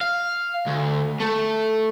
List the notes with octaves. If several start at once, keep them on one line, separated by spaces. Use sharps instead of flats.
F5
D2
A3